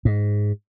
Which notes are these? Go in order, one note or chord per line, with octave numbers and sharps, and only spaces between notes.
G#2